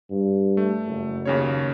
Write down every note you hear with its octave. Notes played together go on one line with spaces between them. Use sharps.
G2
A3
F#1
D#2 C#3 C#5